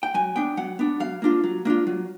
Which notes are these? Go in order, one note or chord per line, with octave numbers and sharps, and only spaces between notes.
G5
F#3 G#5
B3 D4 G5
F#3 F#5
B3 D4
F#3 F5
A#3 D4 F4
F#3
A#3 D4 F4
F#3